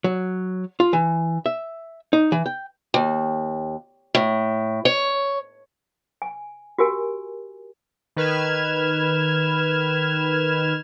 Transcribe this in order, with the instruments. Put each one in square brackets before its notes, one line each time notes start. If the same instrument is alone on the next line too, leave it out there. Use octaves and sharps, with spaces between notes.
[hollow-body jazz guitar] F#3
F4
E3
E5
D#4
E3
G5
[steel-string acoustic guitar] D#2
A2
C#5
[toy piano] G#5
F#4 G4 A#4 G#5
[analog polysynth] D#3 B4 F6 G#6 E7